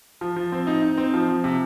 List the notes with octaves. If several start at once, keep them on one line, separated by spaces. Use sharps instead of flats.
F3
F3
C4
D#4
D#4
C4
F3
F3
C3